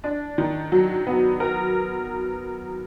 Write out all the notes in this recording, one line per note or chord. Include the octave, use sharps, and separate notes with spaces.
D4
D#3
F#3
B3
A#4